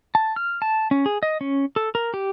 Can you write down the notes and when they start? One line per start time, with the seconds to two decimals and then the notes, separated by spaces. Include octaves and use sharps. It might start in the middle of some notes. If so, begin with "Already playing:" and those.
0.15 A5
0.36 F6
0.62 A5
0.91 C#4
1.06 G#4
1.23 D#5
1.41 C#4
1.76 A4
1.95 A#4
2.14 G4